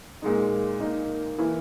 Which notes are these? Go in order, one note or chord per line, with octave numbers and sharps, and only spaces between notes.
A#2 G#3 D#4
A#2 A#3 D#4
E3 A#3 E4